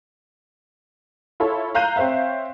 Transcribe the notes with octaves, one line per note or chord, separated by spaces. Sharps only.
E4 F4 A4 C#5
F5 A#5 F#6 G6 D#7
C4 C5 C#5 E5 F5